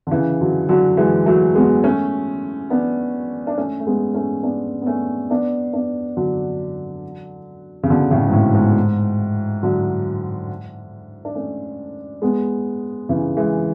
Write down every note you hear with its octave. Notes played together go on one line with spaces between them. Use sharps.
D3
C#3 E3
D3 F#3
D3 F#3
E3 G#3
F#3 A3
G#3 B3
A3 C#4
B3 D4
D4
A3 C#4
A3
G#3 B3
A3 C#4
B3 D4
B3
A3 C#4
B3 D4
B3 D4
D3 F#3
C#3
B2 D3
A2 C#3
G#2
A2
G#2
D3 F#3
D4
A3 C#4
G#3 B3
C#3 E3
E3 G#3